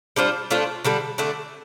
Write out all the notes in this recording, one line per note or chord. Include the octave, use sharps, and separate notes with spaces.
G3 D4 F4 C5
A3 D4 F4 C5
D3 G3 D4 A4
D3 A3 D4